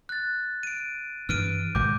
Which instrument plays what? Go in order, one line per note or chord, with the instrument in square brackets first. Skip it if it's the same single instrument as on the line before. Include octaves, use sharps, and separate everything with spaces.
[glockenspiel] F#6 A6
D7 D#7
[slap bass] G2 E3 [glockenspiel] F6 D7 D#7
[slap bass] G#1 B2 G#3 [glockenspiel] D6 G6